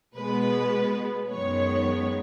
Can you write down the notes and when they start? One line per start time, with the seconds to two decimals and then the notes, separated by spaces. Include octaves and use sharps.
0.16 B2 G#3 B3 B4
1.31 F#2 D#3 G#3 B3 C#5